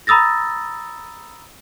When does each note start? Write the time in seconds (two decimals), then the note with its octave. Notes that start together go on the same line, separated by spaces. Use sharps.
0.07 A#5 B5 D#6 E6 A6 A#6